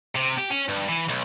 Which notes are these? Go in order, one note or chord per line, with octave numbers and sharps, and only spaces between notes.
C3
G4
C#4
G2
E3
B1